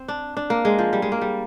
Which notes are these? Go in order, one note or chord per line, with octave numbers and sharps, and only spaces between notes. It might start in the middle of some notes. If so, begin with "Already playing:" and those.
Already playing: C4
D4
D4
A#3
G#3
F3
G3
G#3
A#3
G3